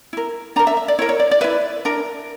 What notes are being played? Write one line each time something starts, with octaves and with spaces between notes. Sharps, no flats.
E4 A#4
D4 A#4 A#5
E5
E5
D5
E4 A#4 C#5
C#5
D5
D5
E4 B4 E5
D4 A#4